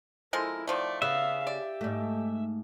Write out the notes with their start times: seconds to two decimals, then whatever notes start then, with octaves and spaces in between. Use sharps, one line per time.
0.33 F3 G#3 E4 A4 A#4
0.67 D#3 F3 A3 D5
1.02 C#3 B3 E5 F5
1.47 G4 D5
1.81 G#2 A3